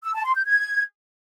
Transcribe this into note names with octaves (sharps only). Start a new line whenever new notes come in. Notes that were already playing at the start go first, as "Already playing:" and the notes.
E6
A5
C6
G6
G#6